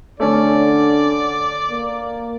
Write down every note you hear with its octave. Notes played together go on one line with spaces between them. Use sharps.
D3 A3 C#4 D5
A#3